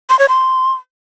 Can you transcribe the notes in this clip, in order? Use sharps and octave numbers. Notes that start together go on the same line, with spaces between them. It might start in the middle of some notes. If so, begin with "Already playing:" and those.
C6
C#5
C6